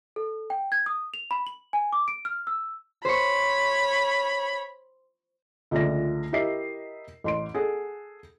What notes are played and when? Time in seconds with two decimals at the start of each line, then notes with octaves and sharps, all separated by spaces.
0.16 A4
0.50 G5
0.72 G#6
0.86 D#6
1.14 F7
1.31 B5
1.47 F#7
1.73 G#5
1.93 D6
2.08 D7
2.25 F6
2.47 E6
3.05 C5 C#5 B5 C#6
5.71 C#2 D3 F3 A3 D5 A#6
6.33 E4 G4 A#4 D#5 E5 C7
7.24 A1 C6 D7
7.55 G#4 A4 F#5